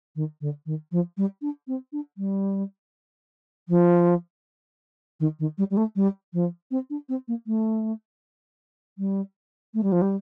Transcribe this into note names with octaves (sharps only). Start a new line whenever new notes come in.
D#3
D3
D#3
F3
G3
D4
C4
D4
G3
F3
D#3
D#3
G3
G3
A3
G3
F3
C4
D4
C4
A#3
A3
G3
A3
G3
F3
G3